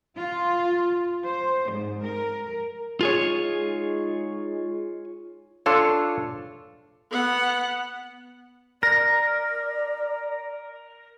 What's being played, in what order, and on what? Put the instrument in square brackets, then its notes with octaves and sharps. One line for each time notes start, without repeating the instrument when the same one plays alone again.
[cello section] F4
C5
G#2
A#4
[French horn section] G#3 D#4 [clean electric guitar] F4 G#4 C#5
[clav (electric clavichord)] D4 A4 C#5 [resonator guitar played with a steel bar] F4
[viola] B3 F#5
[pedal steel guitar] A#4 [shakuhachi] D5 [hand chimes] A#6